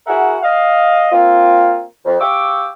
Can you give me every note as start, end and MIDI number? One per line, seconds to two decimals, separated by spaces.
0.07 0.37 64
0.07 0.37 66
0.07 0.37 68
0.07 0.37 70
0.07 0.37 76
0.07 0.37 78
0.43 1.09 75
0.43 1.09 77
1.12 1.82 58
1.12 1.82 60
1.12 1.82 65
2.05 2.19 41
2.20 2.67 67
2.20 2.67 77
2.20 2.67 79
2.20 2.67 85
2.20 2.67 86
2.20 2.67 88